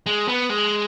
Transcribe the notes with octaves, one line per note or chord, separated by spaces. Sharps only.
G#3
B3
G#3